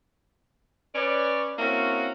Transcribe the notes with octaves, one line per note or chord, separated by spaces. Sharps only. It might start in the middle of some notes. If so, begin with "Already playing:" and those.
C#4 B4 C#5 D5
A#3 C4 C#4 E4 F#4